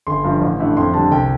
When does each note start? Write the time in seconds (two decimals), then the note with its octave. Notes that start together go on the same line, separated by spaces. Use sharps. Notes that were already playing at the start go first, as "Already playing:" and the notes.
0.07 G1 C6
0.24 G2 F3
0.42 A1
0.60 A2 A3 D4
0.77 F2 C6
0.94 D3 G3 A5
1.12 C2 G5